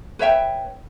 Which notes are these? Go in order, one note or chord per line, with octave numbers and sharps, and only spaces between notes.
B4 C#5 E5 G5